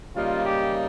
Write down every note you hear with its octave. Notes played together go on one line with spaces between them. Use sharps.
C#3 G3 A#3 D#4 F4
G4